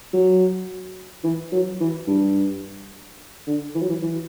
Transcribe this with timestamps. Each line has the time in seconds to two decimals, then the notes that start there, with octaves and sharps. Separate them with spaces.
0.13 F#3
1.24 E3
1.52 F#3
1.80 E3
2.08 G2
3.47 D3
3.75 E3
3.82 F#3
3.89 E3
4.02 E3